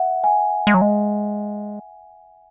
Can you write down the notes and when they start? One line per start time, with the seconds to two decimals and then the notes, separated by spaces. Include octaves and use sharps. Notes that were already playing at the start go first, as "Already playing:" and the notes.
Already playing: E5 F#5
0.24 G#5
0.67 G#3
0.74 F#3
0.82 G#3